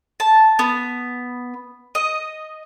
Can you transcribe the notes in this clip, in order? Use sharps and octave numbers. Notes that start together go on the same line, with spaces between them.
A5
B3
D#5